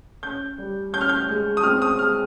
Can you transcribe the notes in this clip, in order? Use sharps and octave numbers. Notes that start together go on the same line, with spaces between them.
C#4 G6
G3
C#4 G6
F6
G6
G#3
D#6
C4 F6
D#6
G#3 F6